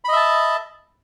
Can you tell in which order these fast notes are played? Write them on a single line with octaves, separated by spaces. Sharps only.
B5 D#5 E5 A5